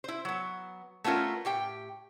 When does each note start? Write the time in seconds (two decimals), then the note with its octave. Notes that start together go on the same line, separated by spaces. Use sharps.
0.04 E4 C5
0.25 F#3 B3
1.04 A3 B3 C#4 F4 A#4
1.45 A2 G4 G5